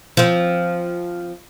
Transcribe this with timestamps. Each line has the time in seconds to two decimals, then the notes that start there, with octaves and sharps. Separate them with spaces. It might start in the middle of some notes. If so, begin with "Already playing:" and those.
0.17 F3 C4